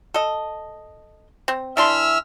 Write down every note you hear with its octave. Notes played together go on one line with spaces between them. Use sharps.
A4 D#5
C4
E3 D4 E5 C6 E6 F6